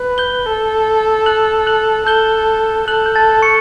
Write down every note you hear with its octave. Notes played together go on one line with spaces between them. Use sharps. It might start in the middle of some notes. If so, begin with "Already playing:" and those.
Already playing: B4
G6 G7
A4
F#6 F#7
F#6 F#7
A4 G6 G7
A4 F#6 F#7
G6
A5 A6
C#6 C#7